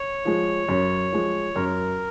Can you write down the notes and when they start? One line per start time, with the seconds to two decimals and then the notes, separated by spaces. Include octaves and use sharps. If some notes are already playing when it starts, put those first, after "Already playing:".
Already playing: C#5
0.25 F3 G#3
0.68 F#2
1.12 F3 G#3
1.56 F#2 A#4